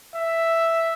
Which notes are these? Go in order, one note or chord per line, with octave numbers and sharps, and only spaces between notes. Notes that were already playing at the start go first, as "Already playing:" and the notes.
E5